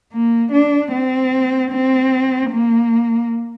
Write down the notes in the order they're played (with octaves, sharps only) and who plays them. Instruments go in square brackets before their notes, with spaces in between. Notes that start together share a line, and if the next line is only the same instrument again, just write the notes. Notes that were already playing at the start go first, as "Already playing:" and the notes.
[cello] A#3
D4
C4
C4
A#3